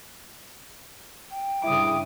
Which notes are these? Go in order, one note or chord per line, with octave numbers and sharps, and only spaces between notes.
G5
G2 C#3 E4 D6 D#6